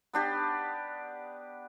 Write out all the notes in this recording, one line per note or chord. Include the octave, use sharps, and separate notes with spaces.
B3 D4 G4 B4